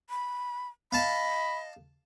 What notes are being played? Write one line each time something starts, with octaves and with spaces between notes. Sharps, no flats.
B5
D#5 F5 A5 B5